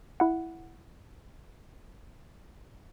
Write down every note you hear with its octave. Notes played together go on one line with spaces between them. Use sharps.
E4 F#5